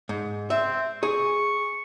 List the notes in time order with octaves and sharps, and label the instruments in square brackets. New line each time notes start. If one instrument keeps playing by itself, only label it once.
[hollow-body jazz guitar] G#2
[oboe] C4 [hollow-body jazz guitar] E5
[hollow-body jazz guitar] G#4 [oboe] C#6